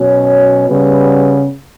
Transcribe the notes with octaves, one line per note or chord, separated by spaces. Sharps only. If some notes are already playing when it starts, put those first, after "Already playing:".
Already playing: B2 F#3 C#4
C#3 G3 B3